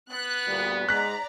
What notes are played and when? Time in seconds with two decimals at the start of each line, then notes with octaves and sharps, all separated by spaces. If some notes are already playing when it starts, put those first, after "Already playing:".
0.10 B3 F#6
0.47 D2 A#2 G3
0.89 G#2 D5 A#5 F#6 B6